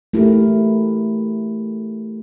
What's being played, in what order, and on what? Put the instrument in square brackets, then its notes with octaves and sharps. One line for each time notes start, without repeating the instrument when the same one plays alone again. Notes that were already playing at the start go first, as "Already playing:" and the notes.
[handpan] A3 E4 G4 A#4